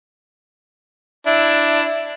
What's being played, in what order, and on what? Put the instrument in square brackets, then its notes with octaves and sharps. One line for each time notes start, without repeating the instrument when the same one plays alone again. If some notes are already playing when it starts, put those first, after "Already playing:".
[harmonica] D4 E4